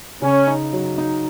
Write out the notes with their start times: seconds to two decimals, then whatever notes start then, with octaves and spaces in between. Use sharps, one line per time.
0.22 C#3 C#4
0.47 D#4
0.73 F#3
0.98 D#4